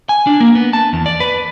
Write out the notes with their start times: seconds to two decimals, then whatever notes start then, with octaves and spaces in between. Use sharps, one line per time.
0.09 G#5
0.27 D4
0.40 A#3
0.55 B3
0.73 A5
0.93 E2
1.06 D5
1.20 B4